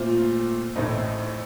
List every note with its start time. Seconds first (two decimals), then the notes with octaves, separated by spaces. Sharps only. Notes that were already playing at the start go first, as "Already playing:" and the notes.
Already playing: A#2 A3 C4 F4
0.76 A1 A2 A3 C4 D#4